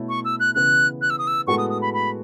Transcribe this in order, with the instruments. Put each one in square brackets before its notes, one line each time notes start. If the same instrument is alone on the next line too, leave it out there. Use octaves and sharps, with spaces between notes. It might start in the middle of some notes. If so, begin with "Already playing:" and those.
Already playing: [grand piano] B2 A3 E4 A4 C#5
[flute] C#6
E6
F#6
[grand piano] C#3 E3 B3 [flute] F#6
[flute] F#6
E6
D#6
E6
[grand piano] A2 G#3 B3 F#4 A4 [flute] C#6
[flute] D#6
D#6
B5
B5